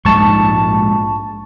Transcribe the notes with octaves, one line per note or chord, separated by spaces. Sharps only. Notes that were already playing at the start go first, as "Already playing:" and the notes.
A#1 G#2 G#3 A5 C#6